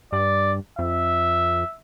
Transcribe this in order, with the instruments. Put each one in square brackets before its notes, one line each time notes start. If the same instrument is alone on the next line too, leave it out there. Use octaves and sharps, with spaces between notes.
[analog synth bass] G2 [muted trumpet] D5
[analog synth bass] F2 [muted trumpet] E5